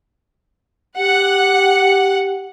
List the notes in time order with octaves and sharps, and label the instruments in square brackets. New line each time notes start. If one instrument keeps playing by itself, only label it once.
[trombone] G4 [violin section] F#5